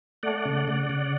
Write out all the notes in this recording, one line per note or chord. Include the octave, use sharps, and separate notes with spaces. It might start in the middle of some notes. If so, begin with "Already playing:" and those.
A3 D5 F#5
C#3
C#3
C#3